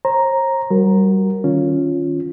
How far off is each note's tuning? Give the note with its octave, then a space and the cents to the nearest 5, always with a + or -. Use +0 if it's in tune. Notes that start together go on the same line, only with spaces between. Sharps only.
C5 +40 A#5 +0
G3 -25 F#4 +0 A#4 +0
D#3 +0 C#4 +0 F4 +0